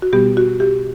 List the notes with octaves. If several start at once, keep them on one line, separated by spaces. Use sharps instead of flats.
F#4
B2 G3 B3 G4
F#4
G4